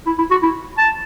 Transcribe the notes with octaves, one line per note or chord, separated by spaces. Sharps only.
E4
E4
F#4
E4
A5